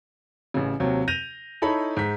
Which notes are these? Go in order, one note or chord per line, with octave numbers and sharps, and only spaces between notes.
A1 C#3
D#2 C3 F#3
G6 A#6 D#7 F7
D#4 E4 A4 C#5 B5
G#2 B6